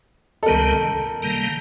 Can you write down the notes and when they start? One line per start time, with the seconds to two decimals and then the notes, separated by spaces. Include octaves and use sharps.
0.43 A4
0.46 C#2 C3 D#3 G3 B3 A#4
1.22 C3 D#3 G3 A#3